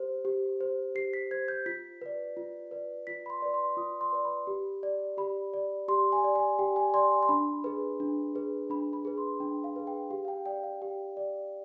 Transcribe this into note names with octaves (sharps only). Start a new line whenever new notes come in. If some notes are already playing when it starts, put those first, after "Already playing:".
Already playing: G4 C5
G4
C5
G4 C7
B6
C5 G#6
G6
F4 B6
B4 D5
F4
B4 D5
F4 B6
B5
C6
B4 D5
C6
F4 D#6
C6
B4 D5
B5
G4
D5
G4 B5
D5
G4 C6
G#5
D5
G#5
G4 G5
G#5
D5 C6
G#5
C6
D4 B5
G#4 B4
D4
G#4 B4
D4 B5
B5
G#4 B4
C6
D4 G5
F5
G#4 B4
G5
G4 F5
F5
G5
D5 G5
F5
G4 G5
D5